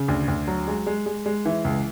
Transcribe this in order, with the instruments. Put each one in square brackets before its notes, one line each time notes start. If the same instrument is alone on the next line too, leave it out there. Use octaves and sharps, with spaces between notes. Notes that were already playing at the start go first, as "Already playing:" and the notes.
Already playing: [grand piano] C#3
D2
D2
F#3
G#3
G#3
G#3
G#3
E3
C#2